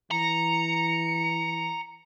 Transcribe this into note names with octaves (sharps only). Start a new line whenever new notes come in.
E3 A#5 C#7